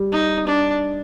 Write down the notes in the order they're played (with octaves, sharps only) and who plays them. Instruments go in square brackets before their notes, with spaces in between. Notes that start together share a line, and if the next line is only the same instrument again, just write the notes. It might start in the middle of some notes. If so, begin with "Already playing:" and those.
Already playing: [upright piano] G3
[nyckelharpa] D#4
D4